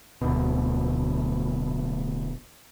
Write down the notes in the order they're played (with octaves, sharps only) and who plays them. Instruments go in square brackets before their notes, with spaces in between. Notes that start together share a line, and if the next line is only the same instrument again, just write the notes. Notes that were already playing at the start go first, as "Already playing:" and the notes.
[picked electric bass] D1 D2 B2